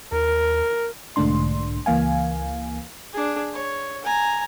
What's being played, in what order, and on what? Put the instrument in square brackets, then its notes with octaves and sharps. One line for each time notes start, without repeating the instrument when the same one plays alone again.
[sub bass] D#2 [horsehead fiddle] A#4
[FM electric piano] B1 G#2 D3 A3 D4 C6
C#2 E3 A#3 F5 G#5
[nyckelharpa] D4 G#4
C#5
G#5 A#5